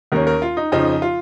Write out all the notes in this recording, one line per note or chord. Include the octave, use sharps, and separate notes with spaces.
D#2 D#3 A#3 C#4 A#4
A#4
F4
D#4
F2 C#3 F3 D#4
F4